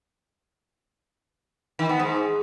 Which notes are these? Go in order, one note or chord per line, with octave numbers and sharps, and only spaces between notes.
D#3
B3
G#2